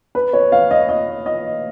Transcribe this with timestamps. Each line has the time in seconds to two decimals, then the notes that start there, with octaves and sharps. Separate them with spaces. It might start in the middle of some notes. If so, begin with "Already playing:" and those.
0.15 B4
0.33 C#5
0.52 F5
0.71 D#5
0.89 D#5
1.26 D#5